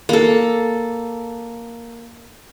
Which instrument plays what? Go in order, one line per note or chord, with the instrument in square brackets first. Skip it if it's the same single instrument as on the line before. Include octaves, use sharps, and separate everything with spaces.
[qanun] A#3 A4